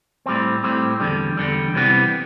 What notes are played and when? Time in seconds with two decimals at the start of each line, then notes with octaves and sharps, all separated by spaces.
0.26 A2 G3 C4
0.64 A2 G3 C4
1.00 E2 D3 G3
1.37 E2 D3 G3
1.74 C2 C3 E3 G3 B3